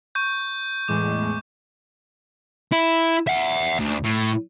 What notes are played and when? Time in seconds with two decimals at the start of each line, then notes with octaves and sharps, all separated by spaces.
0.15 C#6 G6
0.88 E2 A2 G#3 D6
2.72 E4
3.27 E5 F#5
3.79 D2
4.04 A2